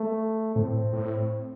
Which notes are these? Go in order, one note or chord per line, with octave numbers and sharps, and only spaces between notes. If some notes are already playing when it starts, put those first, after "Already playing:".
Already playing: A3
A2 C4
A2